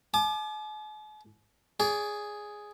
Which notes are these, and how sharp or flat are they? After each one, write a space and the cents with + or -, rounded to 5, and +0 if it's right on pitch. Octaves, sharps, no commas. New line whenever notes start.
G#5 +45 D6 +30
G#4 +0 D5 -35